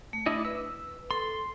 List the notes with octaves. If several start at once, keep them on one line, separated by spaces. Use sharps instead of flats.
A3
D4 E4 D#5
B4 E6
A4 C6